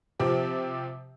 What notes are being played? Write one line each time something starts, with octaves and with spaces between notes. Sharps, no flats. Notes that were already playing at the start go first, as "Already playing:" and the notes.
C3 F3 C4 G4